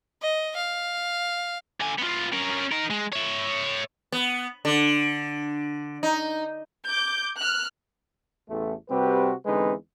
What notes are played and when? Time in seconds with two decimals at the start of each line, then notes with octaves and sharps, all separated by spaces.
0.22 D#5
0.56 F5
1.80 D3 G#5
1.98 B3 F4
2.33 C#4 A#4
2.72 D#4 A#4
2.90 G#3
3.13 C#5 E5
4.12 B3
4.65 D3
6.03 D#4
6.88 D6 G6
7.39 F6 F#6
8.49 A1 E2 A3
8.90 C3 G3 C4 F#4 G4 B4
9.45 E2 D3 G#3 C4 D#4 B4